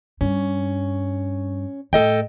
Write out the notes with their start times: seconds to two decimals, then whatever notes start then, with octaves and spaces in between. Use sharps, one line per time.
0.21 G2 C#4
1.93 A2 A4 D#5 G5